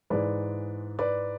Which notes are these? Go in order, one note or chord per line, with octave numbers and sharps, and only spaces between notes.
G#2 E3 G#3 B4 D5
B4 D5